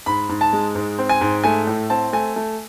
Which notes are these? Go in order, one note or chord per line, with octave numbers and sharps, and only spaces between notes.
G#2 B5
G#2
A5
G#3
G#2
C4
G#5
G#2
A3 G#5
A2
C4 A5
A3 G#5
A3